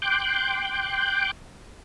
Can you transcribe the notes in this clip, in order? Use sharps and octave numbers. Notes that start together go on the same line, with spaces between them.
G5 C6 D6 F#6 G6